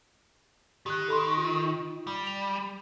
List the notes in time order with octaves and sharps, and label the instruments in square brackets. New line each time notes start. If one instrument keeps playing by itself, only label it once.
[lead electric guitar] D#3 [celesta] G4 F#6
[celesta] A4 B5 C6
F4
[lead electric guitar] G3
[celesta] F7